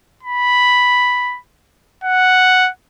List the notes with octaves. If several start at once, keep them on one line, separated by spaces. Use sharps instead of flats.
B5
F#5